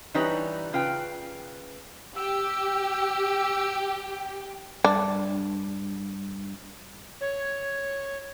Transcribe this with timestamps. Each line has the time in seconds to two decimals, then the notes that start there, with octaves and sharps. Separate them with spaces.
0.14 E3 G3 D#4 B4 C#5
0.73 C#3 F4 B4 G5
2.16 G4 G5 E6
4.84 G2 D4
7.21 C#5